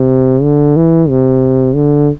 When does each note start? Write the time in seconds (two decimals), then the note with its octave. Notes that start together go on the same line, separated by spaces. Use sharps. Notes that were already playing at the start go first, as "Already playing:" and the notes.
Already playing: C3
0.42 D3
0.76 E3
1.09 C3
1.75 D3